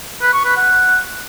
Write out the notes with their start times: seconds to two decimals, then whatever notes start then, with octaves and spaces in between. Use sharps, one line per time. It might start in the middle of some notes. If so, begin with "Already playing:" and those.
0.22 B4
0.33 C#6
0.45 B4
0.56 F#5